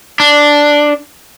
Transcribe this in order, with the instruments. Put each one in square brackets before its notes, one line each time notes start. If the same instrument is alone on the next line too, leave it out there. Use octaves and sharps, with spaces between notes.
[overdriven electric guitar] D4